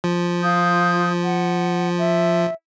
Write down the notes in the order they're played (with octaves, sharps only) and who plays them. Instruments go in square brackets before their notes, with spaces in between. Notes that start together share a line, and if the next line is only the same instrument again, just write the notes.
[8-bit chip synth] F3
[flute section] F4 D#6 G6
F#5
E5